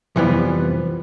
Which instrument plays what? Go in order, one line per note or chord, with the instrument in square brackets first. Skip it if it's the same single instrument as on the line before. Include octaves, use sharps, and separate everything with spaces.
[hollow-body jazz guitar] C2 F2 E3 F3 G3 B3